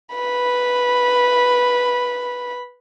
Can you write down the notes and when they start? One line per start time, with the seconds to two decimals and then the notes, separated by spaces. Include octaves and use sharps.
0.15 B4 B5